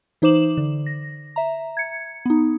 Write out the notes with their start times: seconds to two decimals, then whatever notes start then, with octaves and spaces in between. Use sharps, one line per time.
0.22 E3 D#4 C5 D6 E7 F#7
0.57 D3
0.86 A#6
1.36 E5 A#5
1.77 G#6 C#7
2.26 B3 D#4